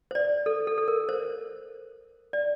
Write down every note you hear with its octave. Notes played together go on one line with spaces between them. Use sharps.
C5
D5
A4
A4
A4
A#4
C5
D5